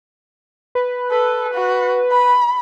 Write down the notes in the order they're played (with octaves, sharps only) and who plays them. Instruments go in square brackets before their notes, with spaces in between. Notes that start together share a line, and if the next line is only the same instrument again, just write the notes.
[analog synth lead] B4
[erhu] A4 [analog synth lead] B4
[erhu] F#4
B5